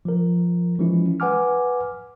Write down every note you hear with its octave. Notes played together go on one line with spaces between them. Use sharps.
F3 A#4
E3 F3 G#3 C#4 E4
B4 F#5 G#5 D6 F6